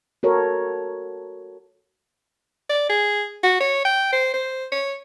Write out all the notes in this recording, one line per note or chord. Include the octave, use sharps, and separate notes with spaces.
F#4 A4 A#4 C#5
D5
G#4
F#4
C#5
G5
C5
C5
C#5